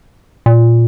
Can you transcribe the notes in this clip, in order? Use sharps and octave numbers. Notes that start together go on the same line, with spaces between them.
A#2